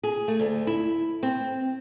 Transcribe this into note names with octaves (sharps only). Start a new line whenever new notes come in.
G#4
A3
D2
E4
C4